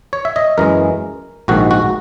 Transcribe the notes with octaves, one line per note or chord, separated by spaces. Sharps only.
C#5
E5
D#5
F#2 E3 G#3 A#4
A#1 G#2 D#3 F#4
F#4